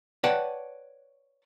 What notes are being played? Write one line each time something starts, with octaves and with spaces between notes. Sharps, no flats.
B4 C#5 D5 F#5 G5 A5